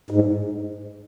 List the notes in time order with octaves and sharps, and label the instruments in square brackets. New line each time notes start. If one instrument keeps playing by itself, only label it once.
[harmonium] G#2